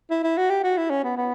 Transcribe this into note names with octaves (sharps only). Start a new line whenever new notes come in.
E4
E4
F#4
G4
F#4
E4
C#4
B3
B3